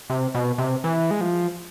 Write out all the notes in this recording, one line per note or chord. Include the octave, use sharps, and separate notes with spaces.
C3
B2
C3
E3
G#3
F3